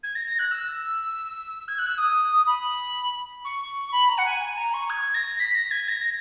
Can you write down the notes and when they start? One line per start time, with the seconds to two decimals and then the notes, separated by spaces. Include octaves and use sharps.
0.03 G#6
0.15 A#6
0.26 A#6
0.39 F#6
0.51 E6
1.68 G#6
1.78 F#6
1.88 E6
1.98 D#6
2.47 B5
3.45 C#6
3.92 B5
4.09 A#5
4.18 F#5
4.26 G#5
4.41 G#5
4.57 A#5
4.74 C#6
4.90 G#6
5.14 A#6
5.40 B6
5.55 A#6
5.71 G#6
5.88 A#6